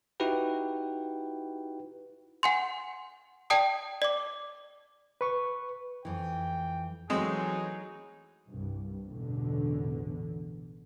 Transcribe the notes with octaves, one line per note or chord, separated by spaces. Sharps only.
D#4 E4 F#4 G4 B4 G5
F#5 G#5 C6
D5 G5 A5 D#6
D5 D6
B4 C#6
F2 E3 G5
E3 F#3 G#3 A3 C4 D#4 G#4 D#5
C2 G2
A1 E2 B2 D3